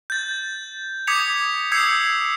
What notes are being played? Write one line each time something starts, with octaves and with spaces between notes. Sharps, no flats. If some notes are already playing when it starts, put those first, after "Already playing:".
G6 A6
D6 D#6 G#6 B6 C#7 F7
D#6 E6 G6 G#6 C7 C#7